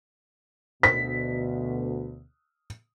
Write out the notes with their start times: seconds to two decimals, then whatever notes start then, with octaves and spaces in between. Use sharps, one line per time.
0.83 D2 B2 B6